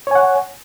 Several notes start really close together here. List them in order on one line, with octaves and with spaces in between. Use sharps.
C#5 G#5 F#5